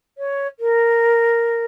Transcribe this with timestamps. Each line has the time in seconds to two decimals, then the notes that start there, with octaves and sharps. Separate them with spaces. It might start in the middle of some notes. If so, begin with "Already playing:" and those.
0.18 C#5
0.59 A#4